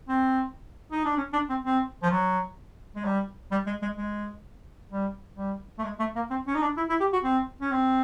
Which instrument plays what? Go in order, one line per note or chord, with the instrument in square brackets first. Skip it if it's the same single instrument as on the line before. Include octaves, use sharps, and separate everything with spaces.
[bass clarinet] C4
D#4
D4
C#4
D4
C4
C4
F3
F#3
G#3
G3
G3
G#3
G#3
G#3
G3
G3
A3
G#3
A3
A#3
C4
C#4
D#4
D4
E4
E4
G4
F#4
C4
C#4
C4